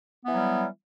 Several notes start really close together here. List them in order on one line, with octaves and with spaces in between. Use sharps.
B3 E3 F#3 G3